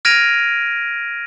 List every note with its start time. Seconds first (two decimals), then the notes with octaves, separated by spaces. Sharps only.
0.05 F6 G#6 A#6 D7 D#7 F7